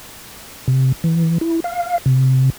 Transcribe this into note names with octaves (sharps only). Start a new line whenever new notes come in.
C3
E3
E4
F5
C3